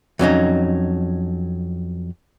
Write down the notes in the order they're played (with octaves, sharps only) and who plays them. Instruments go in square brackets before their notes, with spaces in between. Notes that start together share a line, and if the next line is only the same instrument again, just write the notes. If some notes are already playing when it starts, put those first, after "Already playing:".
[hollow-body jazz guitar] F2 F#3 C#4 D#4